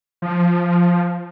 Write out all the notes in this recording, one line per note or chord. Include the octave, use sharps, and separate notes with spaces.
F3